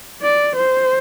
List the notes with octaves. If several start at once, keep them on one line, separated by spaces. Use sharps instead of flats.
D5
C5